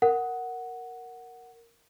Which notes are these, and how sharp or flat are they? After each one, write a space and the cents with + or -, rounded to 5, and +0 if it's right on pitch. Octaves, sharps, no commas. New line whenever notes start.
A#4 +0 F#5 +0